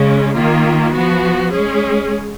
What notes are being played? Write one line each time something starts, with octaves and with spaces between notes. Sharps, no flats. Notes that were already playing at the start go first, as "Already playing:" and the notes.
Already playing: C#3 G#3 C#4
D#3 A#3 F4
F3 B3 F#4
G#3 C#4 G#4